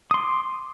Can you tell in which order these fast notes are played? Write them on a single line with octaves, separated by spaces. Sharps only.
D#6 C6 D6